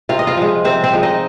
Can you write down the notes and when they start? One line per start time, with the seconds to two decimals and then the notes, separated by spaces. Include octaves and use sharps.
0.09 C3 F4 F5
0.19 D#5
0.27 F4 F5
0.37 F3 G#3
0.65 C3 C4 C5
0.84 C4 C5
0.93 F3 G#3
1.03 D#4 D#5